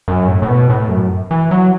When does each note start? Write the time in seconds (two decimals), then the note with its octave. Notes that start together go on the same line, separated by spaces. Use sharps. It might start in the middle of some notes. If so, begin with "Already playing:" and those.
0.08 F#2
0.28 A2
0.42 A2
0.48 B2
0.69 A2
0.89 F#2
1.31 E3
1.51 F#3